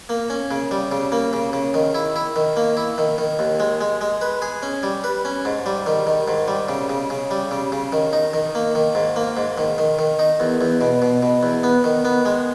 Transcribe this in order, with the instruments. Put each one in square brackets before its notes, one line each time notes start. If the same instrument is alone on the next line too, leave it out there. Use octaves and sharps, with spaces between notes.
[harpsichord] A#3
C#4
C#3
G3
C#3
A#3
C#3
C#3
D#3
E4
E4
D#3
A#3
E4
D#3
D#3
D#2
G#3
G#3
G#3
B4
G#4
C#4
G3
B4
C#4
G#2
G3
D#3
D#3
G#2
G3
C#3
C#3
C#3
G3
C#3
C#3
D#3
D#4
D#3
A#3
D#3
G#2
A#3
G#2
D#3
D#3
D#3
D#4
E2
E2
B2
B2
B2
E2
B3
D#3
B3
G#3